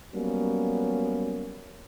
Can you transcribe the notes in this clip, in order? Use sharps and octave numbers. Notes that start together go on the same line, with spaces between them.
F#3 G3 A#3 B3 C#4